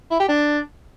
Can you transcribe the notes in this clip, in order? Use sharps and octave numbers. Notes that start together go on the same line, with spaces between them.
E4
G4
D4